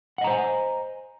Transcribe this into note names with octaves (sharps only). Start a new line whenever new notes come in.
C5 D#5 F#5 G#5 A#5